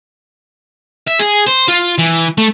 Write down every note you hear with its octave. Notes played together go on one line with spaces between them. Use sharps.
E5
G#4
C5
F4
E3
A3